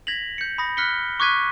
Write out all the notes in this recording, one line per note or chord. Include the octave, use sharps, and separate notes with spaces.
G#6 A#6 B6 F7 F#7
G6 C#7
B5 D#6 A#6
F6 F#6 B6 C#7 G7
C#6 D6 F#6 G#6 B6 D#7